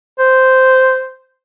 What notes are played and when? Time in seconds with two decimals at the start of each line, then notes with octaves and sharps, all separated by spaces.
0.19 C5